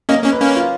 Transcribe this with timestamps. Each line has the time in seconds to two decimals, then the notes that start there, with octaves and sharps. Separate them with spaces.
0.09 A#3 C#4 D#5
0.24 A#3 C#4
0.32 B4
0.40 A#3 C#4
0.56 F4